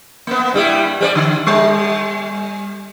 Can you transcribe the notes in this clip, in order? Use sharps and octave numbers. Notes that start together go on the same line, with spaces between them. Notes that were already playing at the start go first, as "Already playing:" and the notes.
A#3 B3
G2 G3 E4
G3 A#4 D5
D3
G3